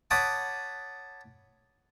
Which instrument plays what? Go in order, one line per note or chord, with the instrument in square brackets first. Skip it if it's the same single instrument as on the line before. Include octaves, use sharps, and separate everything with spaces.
[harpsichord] C#5 F#5 A5 B5 D6 D#6